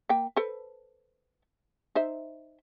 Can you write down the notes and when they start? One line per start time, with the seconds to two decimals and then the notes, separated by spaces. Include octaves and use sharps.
0.09 A#3 G5
0.36 A4 B4 C5
1.95 D#4 C5 E5